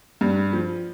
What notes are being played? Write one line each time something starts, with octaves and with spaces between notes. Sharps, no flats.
G2
F3